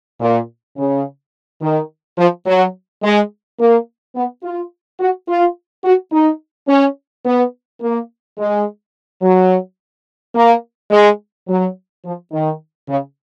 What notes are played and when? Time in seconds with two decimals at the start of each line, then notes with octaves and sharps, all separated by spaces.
0.21 A#2
0.77 C#3
1.62 D#3
2.18 F3
2.46 F#3
3.03 G#3
3.59 A#3
4.16 B3
4.44 F4
5.00 F#4
5.28 F4
5.85 F#4
6.12 D#4
6.68 C#4
7.25 B3
7.81 A#3
8.38 G#3
9.22 F#3
10.35 A#3
10.91 G#3
11.48 F#3
12.04 F3
12.32 D#3
12.89 C#3